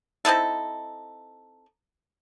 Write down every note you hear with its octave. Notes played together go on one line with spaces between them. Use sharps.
C4 D#4 E4 A4